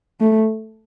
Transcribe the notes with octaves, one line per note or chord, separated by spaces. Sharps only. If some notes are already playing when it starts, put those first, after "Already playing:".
A3